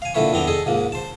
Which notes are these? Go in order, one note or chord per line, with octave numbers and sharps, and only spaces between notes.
F5 G#5
A#2 D3 E3 A3 B4 C#5
E2 D#3 B3 C4 D4 A#5
G#4 A4 D#5
C#2 G#2 A#3
C5 A5